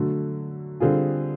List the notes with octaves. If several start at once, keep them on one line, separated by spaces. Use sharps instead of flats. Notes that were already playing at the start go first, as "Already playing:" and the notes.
Already playing: D3 F#3 A3
D3 G3 C4 F4 G#4